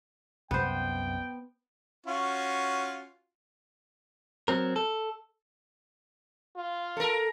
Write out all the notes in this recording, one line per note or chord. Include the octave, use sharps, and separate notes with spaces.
C2 F#2 G3 B3 C5 G5
C#4 F4 F#4
F#3 C4 A#4
A4
F4
A4 A#4